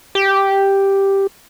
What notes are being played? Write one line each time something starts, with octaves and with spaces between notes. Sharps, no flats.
G4